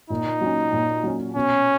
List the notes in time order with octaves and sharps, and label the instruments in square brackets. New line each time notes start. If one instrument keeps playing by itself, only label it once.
[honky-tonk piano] A#2 [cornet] D#4
[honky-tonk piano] F#3 C#4
A#2
F#3 C#4
[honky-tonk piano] B2 [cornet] C#4